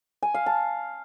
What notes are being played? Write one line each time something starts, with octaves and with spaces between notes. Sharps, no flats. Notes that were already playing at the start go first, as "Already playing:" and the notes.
G#5
F5
A5